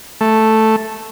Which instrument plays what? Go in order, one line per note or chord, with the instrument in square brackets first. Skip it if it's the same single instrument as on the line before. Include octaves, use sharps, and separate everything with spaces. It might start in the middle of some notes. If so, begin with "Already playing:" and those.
[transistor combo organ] A3